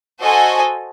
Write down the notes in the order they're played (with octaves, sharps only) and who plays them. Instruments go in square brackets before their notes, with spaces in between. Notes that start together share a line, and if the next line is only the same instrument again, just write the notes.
[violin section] F#4 A4 C5 D#5 G#5